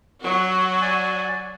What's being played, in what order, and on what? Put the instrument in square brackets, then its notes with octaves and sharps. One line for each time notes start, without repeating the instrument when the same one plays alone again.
[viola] F#3 F#4
[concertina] D5 G#5